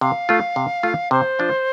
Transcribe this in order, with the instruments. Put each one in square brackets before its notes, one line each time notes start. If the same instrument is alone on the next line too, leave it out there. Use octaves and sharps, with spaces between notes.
[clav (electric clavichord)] C3 [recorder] F5
[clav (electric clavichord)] A3 F4
C3
A3 F4
[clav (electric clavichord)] C3 [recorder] C5
[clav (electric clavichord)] F3 D4 F4